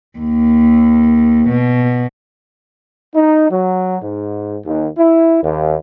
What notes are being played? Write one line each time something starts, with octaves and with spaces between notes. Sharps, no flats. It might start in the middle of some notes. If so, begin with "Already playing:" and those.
D#2
B2
D#4
F#3
G#2
D#2
E4
D#2